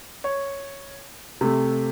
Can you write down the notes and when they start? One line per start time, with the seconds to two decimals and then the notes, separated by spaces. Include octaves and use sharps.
0.24 C#5
1.41 C3 A3